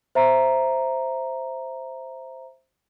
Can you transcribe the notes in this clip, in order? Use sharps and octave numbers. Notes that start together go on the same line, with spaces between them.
C5 E5 A#5